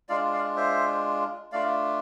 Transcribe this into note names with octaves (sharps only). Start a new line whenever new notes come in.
G#3 D4 F4 D5 F5
D5 F5
C5 E5
A3 D4 F4 D5 F5